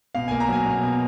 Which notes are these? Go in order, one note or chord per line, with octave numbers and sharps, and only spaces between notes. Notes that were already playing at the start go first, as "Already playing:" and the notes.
B2 F5
A#3 G#5
A#5
F#3 G#5
B2
B2